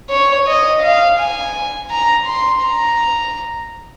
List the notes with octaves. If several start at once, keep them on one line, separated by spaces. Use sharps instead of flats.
C#5
D#5
F5
G#5
A#5
C6
A#5